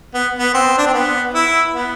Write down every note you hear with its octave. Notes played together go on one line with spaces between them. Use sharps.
B3
B3
C4
D4
C4
B3
E4
B3